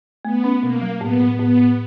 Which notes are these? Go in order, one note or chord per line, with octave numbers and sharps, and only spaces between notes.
A3 B3
C#4
B2 A#3
F#3
A2 B3
A2
A2 B3
A2